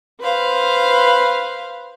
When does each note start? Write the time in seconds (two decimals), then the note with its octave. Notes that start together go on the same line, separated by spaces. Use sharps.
0.21 B4 C5 F5